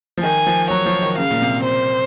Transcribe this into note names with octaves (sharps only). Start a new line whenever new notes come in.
F3
D#3 G#5
F3
F#3 C#5
F3
D#3
C#3 F5
A#2
C3
C5